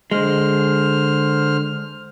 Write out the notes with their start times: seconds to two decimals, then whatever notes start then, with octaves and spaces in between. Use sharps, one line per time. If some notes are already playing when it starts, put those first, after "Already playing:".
0.11 D3 G#3 C5 F6